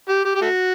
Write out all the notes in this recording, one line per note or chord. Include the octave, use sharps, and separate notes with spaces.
G4
G4
G4
A3 F#4